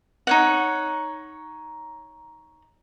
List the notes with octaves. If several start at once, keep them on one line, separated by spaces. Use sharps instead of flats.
D#4 C#5 F#5